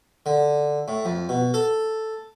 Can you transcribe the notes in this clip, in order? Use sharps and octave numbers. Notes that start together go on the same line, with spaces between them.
D3
A2
F2
B2
A4